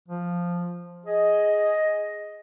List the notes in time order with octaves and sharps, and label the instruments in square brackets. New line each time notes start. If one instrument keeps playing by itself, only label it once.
[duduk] F3
[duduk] G#4 [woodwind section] D#5